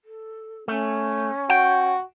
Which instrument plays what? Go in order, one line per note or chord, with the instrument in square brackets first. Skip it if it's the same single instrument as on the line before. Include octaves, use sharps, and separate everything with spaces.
[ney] A4
[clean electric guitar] A3 [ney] C#4
[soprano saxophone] F#4 [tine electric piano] F#5 [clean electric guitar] G5